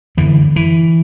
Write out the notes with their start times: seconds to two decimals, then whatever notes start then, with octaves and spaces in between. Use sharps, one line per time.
0.17 F#2 D3 E3
0.56 E3